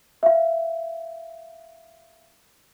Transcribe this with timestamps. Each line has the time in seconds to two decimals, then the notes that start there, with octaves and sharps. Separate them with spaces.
0.23 E5 F5